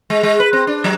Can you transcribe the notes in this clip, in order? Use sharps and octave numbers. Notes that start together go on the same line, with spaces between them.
G#3
G#3
B4
C4
D4
F#3